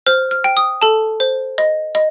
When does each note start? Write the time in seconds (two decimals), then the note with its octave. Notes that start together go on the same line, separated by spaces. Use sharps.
0.07 C5 F6
0.31 F6
0.44 G5
0.57 D#6
0.82 A4 A5
1.20 C5
1.58 D#5
1.95 D#5